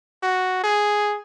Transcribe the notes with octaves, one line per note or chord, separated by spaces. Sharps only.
F#4
G#4